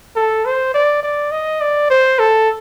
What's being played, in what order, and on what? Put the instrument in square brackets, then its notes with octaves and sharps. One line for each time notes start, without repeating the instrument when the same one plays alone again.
[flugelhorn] A4
C5
D5
D5
D#5
D5
C5
A4